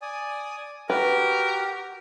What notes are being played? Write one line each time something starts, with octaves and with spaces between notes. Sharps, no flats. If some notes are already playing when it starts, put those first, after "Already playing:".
D5 G#5 D#6
F#4 G4 A#4 B4